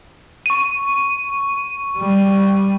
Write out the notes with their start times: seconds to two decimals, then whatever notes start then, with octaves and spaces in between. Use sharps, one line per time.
0.46 C#6 D#7
1.98 G3